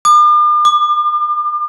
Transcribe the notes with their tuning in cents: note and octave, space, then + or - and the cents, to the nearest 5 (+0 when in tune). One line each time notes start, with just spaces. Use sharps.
D6 +45
D6 +25